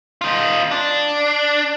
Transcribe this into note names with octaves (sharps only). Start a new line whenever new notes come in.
D#4 F4
D4